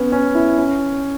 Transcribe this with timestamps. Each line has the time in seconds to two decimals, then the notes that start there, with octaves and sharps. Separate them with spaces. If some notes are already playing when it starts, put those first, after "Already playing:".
Already playing: B3 C#4
0.12 C#4
0.35 E4
0.58 C#4